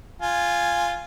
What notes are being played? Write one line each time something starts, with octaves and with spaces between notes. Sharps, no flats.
F4 G#5